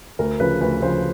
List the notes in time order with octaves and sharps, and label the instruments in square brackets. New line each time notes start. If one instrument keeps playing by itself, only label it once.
[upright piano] D2 [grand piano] A#4
[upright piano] C#3 F3 [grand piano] B4
[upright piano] D2 [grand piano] B4
[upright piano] C#3 F3 [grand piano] C5